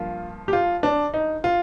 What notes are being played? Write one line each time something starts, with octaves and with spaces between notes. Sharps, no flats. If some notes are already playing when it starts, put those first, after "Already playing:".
Already playing: G2 F3 A#3 F4
G4
F4
D4
D#4
F4